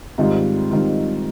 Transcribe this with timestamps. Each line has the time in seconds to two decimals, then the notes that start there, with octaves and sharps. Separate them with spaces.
0.18 G#2 D#3 G3 C4 F4
0.71 G#2 D#3 G3 C4 F4